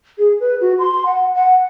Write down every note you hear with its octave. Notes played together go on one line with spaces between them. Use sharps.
G#4
B4
F#4
C6
F#5
F#5